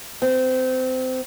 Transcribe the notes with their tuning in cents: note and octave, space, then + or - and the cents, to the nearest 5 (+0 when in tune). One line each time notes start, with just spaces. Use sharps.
C4 -25